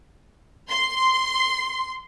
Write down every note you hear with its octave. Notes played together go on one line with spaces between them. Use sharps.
C6 C7